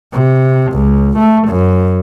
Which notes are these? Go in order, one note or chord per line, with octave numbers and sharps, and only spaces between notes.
C3
C#2
A3
F#2